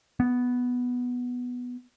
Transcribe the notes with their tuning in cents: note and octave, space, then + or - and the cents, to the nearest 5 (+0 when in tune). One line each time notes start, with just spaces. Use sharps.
B3 +0